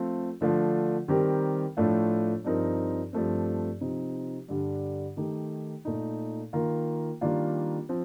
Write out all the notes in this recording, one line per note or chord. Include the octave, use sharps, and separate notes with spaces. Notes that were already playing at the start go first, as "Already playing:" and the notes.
Already playing: F3 A3 C4 F4 A4
D3 F3 A3 D4 F4
D#3 G3 C4 G4 A#4
A2 F3 A3 D4 F4
G2 F3 C4 D#4 A#4
G2 F3 A3 C4
C3 F3 C4 D#4
G2 D3 G3 D4
D#3 A3 D#4 G4
A#2 A3 D#4
D#3 A#3 F4 A#4
D#3 G3 A#3 D4 F4
F3 C4